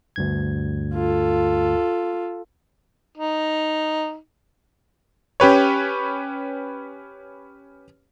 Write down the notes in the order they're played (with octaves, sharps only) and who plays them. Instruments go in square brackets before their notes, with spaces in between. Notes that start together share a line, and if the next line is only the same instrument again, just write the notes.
[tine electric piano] D2 G2 G#6
[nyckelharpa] F4 A4
[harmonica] D#4
[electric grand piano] C#4 G4 B4 C#5